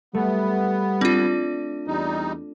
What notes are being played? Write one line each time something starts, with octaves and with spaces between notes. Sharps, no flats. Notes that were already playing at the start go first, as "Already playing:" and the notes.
G3 A3 B3
C4 D4 F4
E2 G3 D#4